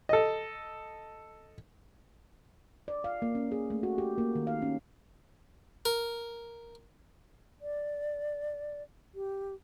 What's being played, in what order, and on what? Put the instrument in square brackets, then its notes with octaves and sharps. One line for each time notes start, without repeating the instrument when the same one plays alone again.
[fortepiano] A4 D#5
[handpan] D5
F5
A#3
C#4
G#4
A3
F#4
G4
A#3
D#3
F5
C#4
[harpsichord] A#4
[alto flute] D5
G4